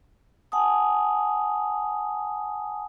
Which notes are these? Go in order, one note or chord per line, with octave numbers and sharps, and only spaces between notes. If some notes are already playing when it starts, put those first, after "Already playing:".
F#5 G#5 A5 D#6